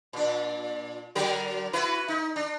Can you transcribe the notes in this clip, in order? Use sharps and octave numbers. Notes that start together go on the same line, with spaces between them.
A#2 D4
D3 F#3 A#4
E4 F#4 B4
D#4
D4